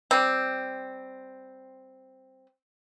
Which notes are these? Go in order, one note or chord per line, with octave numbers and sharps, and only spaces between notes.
G3 C4